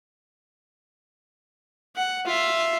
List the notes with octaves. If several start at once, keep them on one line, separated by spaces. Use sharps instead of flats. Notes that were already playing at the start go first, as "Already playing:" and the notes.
F#5
F4 E5